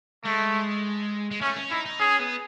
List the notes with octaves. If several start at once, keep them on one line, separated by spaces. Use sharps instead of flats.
G#3 A3
G#3
A3 C#4
C#4
D#4 E4
D#4
C#4 G#4
B3